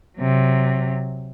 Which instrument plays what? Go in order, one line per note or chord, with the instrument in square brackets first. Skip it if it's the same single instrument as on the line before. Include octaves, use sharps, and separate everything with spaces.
[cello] C3 F#3